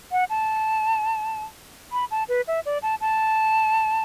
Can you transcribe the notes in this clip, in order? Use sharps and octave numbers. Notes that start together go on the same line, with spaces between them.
F#5
A5
B5
A5
B4
E5
D5
A5
A5